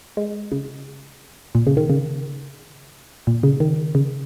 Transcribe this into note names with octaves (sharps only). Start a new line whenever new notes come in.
G#3
C#3
A#2
C#3
D#3
C#3
A#2
C#3
D#3
C#3